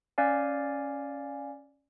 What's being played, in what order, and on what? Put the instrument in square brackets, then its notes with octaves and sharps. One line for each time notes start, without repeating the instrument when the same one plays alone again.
[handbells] C#4 D5 F5 G#5